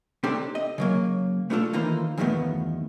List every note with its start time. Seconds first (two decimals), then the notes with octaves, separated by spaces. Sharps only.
0.23 C4 D4 D#4 G4 A4
0.55 D#5
0.78 C#3 F#3 A#3
1.50 A3 B3 D4 F4 A4
1.73 D#3 E3 A#3 D#4 F4 C5
2.18 E2 G2 D#3 F3 A3 B3